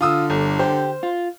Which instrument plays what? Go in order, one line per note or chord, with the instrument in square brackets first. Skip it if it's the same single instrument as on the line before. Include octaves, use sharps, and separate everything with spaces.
[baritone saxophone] D3 [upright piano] F4 D#6 E6
[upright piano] G1
[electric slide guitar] G4 [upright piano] C5
[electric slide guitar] F4